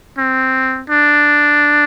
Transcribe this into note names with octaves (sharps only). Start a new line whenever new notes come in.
C4
D4